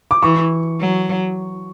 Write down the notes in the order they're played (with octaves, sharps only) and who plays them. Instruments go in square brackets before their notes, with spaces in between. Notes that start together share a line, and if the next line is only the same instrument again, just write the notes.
[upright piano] D6
[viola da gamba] E3 [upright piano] C#6
[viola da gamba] F#3